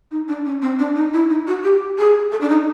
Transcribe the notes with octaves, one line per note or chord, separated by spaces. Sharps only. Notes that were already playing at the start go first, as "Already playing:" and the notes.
D#4
D4
C#4
C4
D4
D#4
E4
D#4
F#4
G4
G#4
A4
D4
D#4